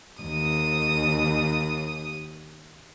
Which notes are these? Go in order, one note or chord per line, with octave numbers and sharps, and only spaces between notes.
D#2 D#6